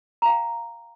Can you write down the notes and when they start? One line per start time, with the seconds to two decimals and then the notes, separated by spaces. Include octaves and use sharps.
0.22 A#5
0.26 F5
0.29 G5